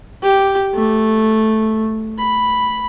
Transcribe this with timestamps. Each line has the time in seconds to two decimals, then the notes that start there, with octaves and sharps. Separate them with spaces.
0.22 G4
0.75 A3
2.19 B5